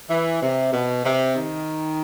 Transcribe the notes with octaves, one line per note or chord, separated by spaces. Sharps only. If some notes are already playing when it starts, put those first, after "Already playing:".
E3
C3
B2
C3
D#3